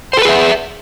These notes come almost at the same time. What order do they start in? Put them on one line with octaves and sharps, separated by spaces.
C5 A4 B4 G#4 E5